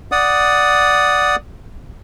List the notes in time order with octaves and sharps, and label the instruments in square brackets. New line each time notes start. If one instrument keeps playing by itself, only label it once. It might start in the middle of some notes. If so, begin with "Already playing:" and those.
[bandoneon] D5 F#5 D#6